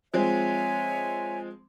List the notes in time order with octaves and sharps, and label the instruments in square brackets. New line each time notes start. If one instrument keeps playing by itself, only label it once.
[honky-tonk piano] F3 G#3 C4 [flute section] C#5 E5 G#5